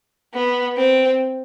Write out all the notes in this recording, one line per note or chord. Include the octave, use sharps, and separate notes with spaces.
B3
C4